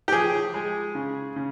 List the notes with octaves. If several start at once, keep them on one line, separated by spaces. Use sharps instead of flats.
G4
F3 G#4
G#3
C#3
C#3